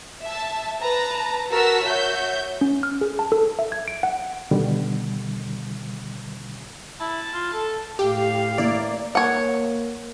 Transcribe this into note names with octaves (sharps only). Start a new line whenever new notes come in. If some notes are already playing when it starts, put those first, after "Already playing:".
E5 A5
B4 A5 A#5
F#4 A#4 A5 E6 B6
F#4 C#5 E5 G6
C#4
F6
G#4
A5
A4
E5
G#6
D7
F#5
B2 D3 D#3 G3
E4 A5
F4
A4
A2 G4 F5
A#3 E4 D5
A#3 C#5 F#5